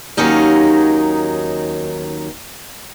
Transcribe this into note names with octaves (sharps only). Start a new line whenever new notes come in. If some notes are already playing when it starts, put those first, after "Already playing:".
D#2 D#3 F#3 C#4 D#4 F5